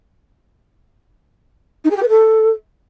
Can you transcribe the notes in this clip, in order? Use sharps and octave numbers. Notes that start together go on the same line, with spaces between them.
D#4
G#4
G4
B4
A4